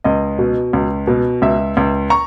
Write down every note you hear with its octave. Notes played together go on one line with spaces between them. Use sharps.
C#2 D#5
B2
C#2
B2
C#2 E5
C#2
A#5 C#6